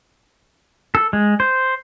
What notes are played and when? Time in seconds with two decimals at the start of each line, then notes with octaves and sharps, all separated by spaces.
0.95 A4
1.13 G#3
1.40 C5